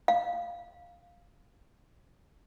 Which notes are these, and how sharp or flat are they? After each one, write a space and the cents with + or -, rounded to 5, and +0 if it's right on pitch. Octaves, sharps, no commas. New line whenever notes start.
F5 +0